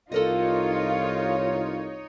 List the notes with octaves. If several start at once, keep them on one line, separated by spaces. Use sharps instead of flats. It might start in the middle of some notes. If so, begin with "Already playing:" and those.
C2 D#4 F4 A4 A#4 C#5 D#5